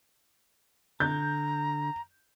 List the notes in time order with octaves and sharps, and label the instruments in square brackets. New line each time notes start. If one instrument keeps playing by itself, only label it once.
[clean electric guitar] D3 [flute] A#5 [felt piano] G6